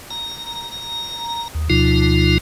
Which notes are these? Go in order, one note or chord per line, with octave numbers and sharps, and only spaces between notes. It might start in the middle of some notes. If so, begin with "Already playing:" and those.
A#5
D#2
D2 B2 F3 D#4 F4